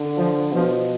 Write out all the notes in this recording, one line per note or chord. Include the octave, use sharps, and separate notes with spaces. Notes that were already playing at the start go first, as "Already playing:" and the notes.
Already playing: D3
F3
B2 F3